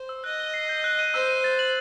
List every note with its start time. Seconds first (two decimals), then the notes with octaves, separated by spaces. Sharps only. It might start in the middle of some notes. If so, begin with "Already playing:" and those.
Already playing: C5
0.09 E6
0.24 D#5 F#6
0.39 G7
0.54 C7
0.69 G6
0.84 F#6
0.99 D#7
1.14 C5 E6
1.29 D#7
1.44 A6
1.59 F#7